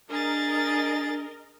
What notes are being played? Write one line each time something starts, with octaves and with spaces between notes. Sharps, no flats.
D4 G#4 A#4 D#5 A6